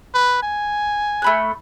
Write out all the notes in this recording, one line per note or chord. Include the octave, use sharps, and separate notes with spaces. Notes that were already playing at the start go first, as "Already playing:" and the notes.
B4
G#5
A3 B5 F#6